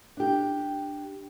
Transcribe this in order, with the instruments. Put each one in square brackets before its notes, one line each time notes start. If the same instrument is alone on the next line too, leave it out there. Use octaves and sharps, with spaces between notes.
[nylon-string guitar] D4 G4